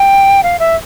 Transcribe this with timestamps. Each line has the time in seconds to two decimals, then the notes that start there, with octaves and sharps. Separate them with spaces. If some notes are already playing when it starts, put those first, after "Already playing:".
Already playing: G5
0.43 F5
0.60 E5